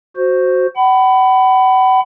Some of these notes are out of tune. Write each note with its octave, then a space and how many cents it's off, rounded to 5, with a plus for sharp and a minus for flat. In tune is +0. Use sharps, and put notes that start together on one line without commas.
F#4 +0 C5 +0
F#5 +40 B5 +15